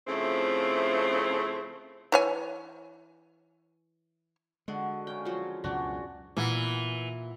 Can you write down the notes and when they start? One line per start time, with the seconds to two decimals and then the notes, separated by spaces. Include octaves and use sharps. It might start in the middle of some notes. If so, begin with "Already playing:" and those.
0.07 C#3 F3 A3 C4 E4
2.12 E3 C#5 G#5
4.68 D3 G#3 F#4
5.07 C#3 C#4 F5 G5
5.25 F3 F#3
5.64 C#2 F#2 B2 D4 F#4 G5
6.37 A#2 E3 E4 F#5